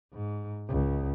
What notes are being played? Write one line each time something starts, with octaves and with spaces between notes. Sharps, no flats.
G#2
C#2